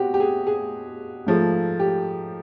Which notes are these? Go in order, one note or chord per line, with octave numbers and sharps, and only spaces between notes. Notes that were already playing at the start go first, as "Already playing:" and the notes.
Already playing: B2 C4 F#4 G4
G4
G#4
G#4
G#2 F3 A3
G4